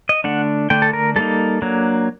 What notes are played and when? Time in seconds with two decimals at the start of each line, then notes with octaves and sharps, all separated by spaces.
0.09 D#5
0.24 D3 A3 D4 F#5
0.70 D3 A3 D4 G5
0.82 A4
0.93 A#4
1.16 G3 A#3 D#4 A4
1.62 F#3 A#3 D4